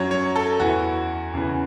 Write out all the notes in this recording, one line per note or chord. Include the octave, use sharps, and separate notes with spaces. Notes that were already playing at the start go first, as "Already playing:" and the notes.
Already playing: F#2 F#3 C#5
C#5
A4
E2 E3 F#4
E2 C#3 E3